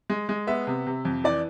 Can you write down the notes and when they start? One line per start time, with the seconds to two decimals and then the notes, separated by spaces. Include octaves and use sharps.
0.10 G#3
0.29 G#3
0.47 B3 E5
0.67 C3
0.87 C3
1.05 F2
1.24 E3 D5